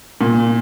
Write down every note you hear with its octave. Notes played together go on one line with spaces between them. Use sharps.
A#2